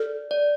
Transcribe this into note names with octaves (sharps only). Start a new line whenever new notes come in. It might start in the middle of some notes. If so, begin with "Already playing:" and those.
Already playing: A4 D5
D5